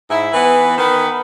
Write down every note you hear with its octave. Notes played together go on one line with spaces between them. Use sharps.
G#2 E4
E3 B3
D#3 B3